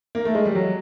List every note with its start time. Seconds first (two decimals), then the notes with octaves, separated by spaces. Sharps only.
0.15 A#3
0.25 A3
0.35 G#3
0.46 G3
0.55 F#3